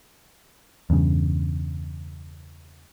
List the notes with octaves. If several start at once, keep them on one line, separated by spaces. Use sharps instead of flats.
E2 G2 C#3